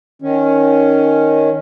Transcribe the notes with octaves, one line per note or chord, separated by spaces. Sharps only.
D#3 C#4